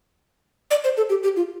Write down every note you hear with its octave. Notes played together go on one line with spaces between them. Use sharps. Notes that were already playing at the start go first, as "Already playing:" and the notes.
D5
C5
A4
G4
G4
F4